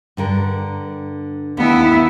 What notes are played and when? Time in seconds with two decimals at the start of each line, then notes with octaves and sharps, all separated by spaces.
0.17 G2 D3 A#4
1.57 D#2 B3 E4 A5